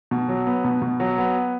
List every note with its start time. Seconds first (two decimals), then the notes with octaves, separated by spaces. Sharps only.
0.11 B2
0.28 F#3
0.47 B3
0.64 B2
0.82 B2
1.00 F#3
1.18 B3